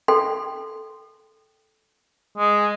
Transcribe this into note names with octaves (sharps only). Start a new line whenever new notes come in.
A4 G5 C6
G#3